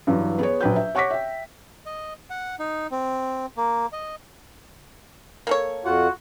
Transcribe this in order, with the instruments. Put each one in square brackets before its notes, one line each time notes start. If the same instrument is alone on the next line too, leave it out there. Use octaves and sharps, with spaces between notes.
[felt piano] G2 E3 F#3
B3 G#4 C#5
A#1 F#3 B4 G5 G6
E5
C#5 F#5 C#6 D6 A#6 B6
E5 G5
[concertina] D#5
F#5
D#4
C4
A#3
D#5
[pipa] A#3 A4 C#5
[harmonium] F2 F4 F#5 [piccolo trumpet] F#4